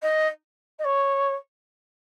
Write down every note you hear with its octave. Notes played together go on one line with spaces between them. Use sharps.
D#5
D#5
C#5